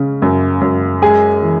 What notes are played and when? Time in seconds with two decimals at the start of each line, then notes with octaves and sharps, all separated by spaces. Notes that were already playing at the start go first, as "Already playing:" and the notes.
Already playing: C#3 G#3 C#4
0.22 F#2
0.61 F#2
1.02 G#3 G#4 G#5
1.42 E3